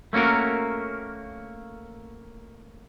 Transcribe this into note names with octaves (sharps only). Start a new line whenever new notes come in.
A3 A#3 C#4 F#4 A#4